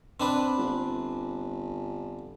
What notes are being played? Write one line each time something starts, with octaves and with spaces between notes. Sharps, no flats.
C4 D4 B4
G1